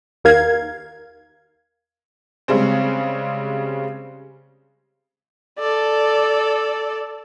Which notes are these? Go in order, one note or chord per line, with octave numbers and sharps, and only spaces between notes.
D#2 A#4 F5 G#6
C#3 G3 G#3 C4
A4 D5